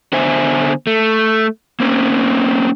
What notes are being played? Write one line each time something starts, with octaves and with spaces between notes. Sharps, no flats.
D3 B3 C5 E5 G#5
A3
A#3 C4 C#4